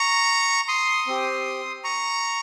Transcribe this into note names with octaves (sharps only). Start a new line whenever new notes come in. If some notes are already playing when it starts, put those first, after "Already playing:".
Already playing: A#5 C#6
C6 D#6
C4 G4
A#5 C#6